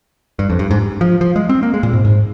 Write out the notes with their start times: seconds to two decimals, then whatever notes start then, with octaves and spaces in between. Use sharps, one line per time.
0.39 G2
0.50 F2
0.59 G2
0.71 G#2
1.01 F3
1.21 F3
1.36 G#3
1.49 C4
1.63 A#3
1.74 G#3
1.83 A#2
1.93 G#2
2.05 G#2